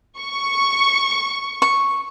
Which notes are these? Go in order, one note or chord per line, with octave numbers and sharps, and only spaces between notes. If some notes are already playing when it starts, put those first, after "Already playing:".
C#6
C#6